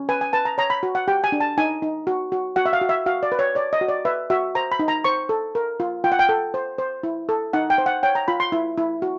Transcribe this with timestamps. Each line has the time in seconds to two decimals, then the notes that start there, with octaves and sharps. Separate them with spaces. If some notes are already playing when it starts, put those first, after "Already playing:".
Already playing: C#4
0.09 B4 G#5
0.21 G#5
0.33 B4 A5
0.45 A#5
0.58 C#5 A#5
0.70 B5
0.83 F#4
0.95 F#5
1.08 G4 G5
1.24 G#5
1.32 D4
1.40 A5
1.58 D#4 G#5
1.82 D#4
2.07 F#4
2.32 F#4
2.56 F#4 F#5
2.66 E5
2.73 F5
2.81 F#4
2.89 E5
3.06 F#4 F5
3.23 D5
3.32 B4
3.39 C#5
3.55 C#5 D5
3.73 D#5
3.81 F#4
3.88 D5
4.05 B4 E5
4.30 F#4 E5
4.55 C5 A#5
4.72 B5
4.79 D#4
4.88 A#5
5.04 C5 C#6
5.29 A4
5.55 A#4
5.80 F4
6.04 F4 G5
6.12 F#5
6.19 G5
6.29 A4
6.54 C5
6.78 C5
7.03 E4
7.29 A4
7.53 D#4 F#5
7.70 G5
7.78 C5
7.86 F#5
8.03 C#5 G5
8.15 A#5
8.28 F4 B5
8.40 C6
8.52 E4
8.78 E4
9.02 F#4